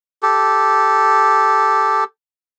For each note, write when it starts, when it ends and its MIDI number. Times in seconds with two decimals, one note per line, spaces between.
0.23 2.04 67
0.23 2.04 69